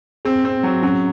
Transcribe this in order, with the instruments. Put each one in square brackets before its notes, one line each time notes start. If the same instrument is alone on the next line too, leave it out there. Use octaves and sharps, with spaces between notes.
[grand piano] C4 [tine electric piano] G#4
[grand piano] C4
F#3
[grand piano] F#3 [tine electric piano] C#4